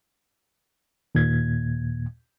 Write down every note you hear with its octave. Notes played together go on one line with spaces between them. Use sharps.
D#2 A#2 G#6